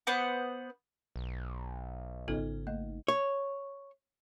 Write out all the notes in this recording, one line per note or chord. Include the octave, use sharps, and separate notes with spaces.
B3 C5 F#5 D6
B1
G#1 C#3 B3 D#4 F4 A4
A3 A#3 D#5
C#5